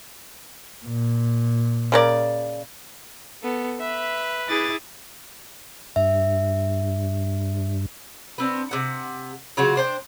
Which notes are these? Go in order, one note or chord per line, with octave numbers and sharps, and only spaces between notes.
A#2
C#3 A#4 D5
B3 A4
B4 E5
E4 G#4 D6 A6
G2 E5
B3 C4 D4
C3 F#5
C#3 F#3 F4 F#4
D4 C5 G5